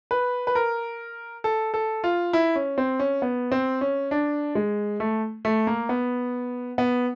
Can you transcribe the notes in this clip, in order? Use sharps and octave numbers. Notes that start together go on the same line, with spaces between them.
B4
B4
A#4
A4
A4
F4
E4
C#4
C4
C#4
B3
C4
C#4
D4
G#3
A3
A3
A#3
B3
B3